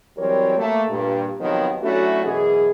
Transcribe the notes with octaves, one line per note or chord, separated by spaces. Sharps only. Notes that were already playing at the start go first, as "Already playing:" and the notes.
E3 F#3 G3 C4 A#4 C#5
A3 A#3
G2 A#2
C3 D#3 F3 F#3 B3
F#3 A3 C#4 D4 E4 F#4
F#2 B2 E3 G#4